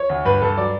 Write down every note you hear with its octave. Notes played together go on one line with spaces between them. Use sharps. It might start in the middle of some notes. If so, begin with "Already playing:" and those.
Already playing: C#5
D2
G2 B4
G2 A4
F#3 D5